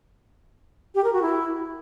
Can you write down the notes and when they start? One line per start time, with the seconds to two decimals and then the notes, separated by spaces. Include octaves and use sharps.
0.95 G4
1.04 A#4
1.13 F#4
1.22 E4